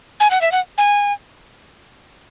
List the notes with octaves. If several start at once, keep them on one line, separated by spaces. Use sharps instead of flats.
G#5
F#5
E5
F#5
G#5